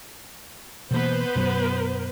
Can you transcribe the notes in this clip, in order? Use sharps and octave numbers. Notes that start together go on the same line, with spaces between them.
B2 E3 A#3 B3 B4 C5
F#2 B2 F#3